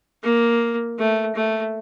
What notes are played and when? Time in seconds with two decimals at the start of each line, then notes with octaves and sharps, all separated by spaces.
0.23 A#3
0.98 A3
1.36 A3